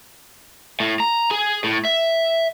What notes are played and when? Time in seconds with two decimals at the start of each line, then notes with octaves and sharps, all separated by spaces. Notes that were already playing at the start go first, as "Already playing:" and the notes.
0.80 A2
1.00 A#5
1.31 G#4
1.64 A2
1.85 E5